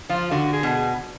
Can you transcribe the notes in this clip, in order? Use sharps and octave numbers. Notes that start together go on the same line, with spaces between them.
F3 F4
D3 F#4
G#4
B2